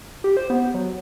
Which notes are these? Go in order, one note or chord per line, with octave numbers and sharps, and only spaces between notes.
G4
C5
B3
F#3